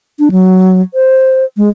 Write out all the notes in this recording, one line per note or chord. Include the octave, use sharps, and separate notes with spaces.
D4
F#3
C5
G#3